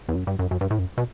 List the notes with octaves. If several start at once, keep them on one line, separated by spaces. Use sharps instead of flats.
E2
F#2
G2
F#2
F#2
G2
A2
F#2
B2